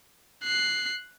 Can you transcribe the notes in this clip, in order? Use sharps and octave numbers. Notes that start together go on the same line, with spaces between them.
F#6 C7